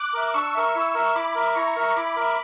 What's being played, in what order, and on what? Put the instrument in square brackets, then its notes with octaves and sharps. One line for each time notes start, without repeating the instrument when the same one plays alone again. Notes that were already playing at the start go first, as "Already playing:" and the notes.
Already playing: [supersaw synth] D6 F#6
[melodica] A#4 E5
[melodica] D4 [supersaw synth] C#6 E6
[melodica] A#4 E5
[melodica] E4 [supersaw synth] C#6 E6
[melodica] A#4 E5
[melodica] E4 [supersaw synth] B5 D6
[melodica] A#4 E5
[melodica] E4 [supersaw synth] A#5 C#6
[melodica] A#4 E5
[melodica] E4 [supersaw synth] B5 D6
[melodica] A#4 E5